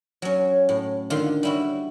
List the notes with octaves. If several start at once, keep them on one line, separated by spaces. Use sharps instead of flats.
F#3 C#4
A2
D3 D#3 F4 C6
G3 E4 F#4